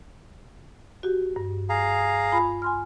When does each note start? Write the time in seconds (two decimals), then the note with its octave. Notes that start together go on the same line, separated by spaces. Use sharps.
1.03 F#4 G4
1.36 G2
1.69 G#4 F5 A#5
2.32 F4 G#5 B5
2.62 G#5 C6 F6